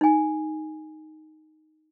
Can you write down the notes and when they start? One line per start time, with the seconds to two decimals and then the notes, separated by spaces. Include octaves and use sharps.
0.01 D#4 G#5